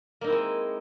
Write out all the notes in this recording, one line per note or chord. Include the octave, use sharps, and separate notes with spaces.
G#3 A#3 C4 D#4 E4